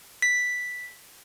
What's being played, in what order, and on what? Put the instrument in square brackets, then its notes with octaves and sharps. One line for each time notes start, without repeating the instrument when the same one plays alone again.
[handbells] B6